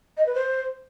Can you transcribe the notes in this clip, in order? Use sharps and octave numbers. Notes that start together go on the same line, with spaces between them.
D#5
B4
C5